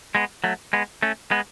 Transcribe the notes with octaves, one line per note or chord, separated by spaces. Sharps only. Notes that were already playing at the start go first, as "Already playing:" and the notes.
G#3 B3
F#3 A3
G#3 B3
A3 C#4
G#3 B3